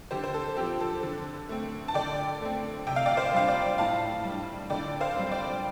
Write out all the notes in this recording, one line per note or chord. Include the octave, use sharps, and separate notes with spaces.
D3 G4 C5
C5
A4
F3 C4 G4
A4
D3
A3 C4
A5
D3 D5 G5
A3 C4
C3 G5
F5
D5 G5
C5 F5
G3 D4 F5
D5 G5
A2 F5 A5
G3
D4
D3 D5 G5
C5 F5
G3 C4
D5 G5